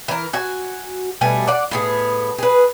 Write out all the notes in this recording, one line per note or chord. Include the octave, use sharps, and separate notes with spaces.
E3 A#4
F#4 G#5
B2 G3 A3 G#5
D5 F#5
A2 B3 G#4
G#4 B4